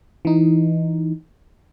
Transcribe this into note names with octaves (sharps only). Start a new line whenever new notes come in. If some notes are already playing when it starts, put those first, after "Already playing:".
E3 D#4